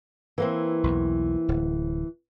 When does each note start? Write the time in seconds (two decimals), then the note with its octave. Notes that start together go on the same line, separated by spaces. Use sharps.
0.38 E3 A#3 C4
0.84 B1 E2
1.48 D1